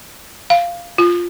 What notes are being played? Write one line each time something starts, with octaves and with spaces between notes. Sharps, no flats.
F5
F4